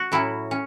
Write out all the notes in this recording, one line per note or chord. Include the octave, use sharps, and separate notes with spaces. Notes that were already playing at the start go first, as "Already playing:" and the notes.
Already playing: F#4
A2 F#3 C#4 E4
C#4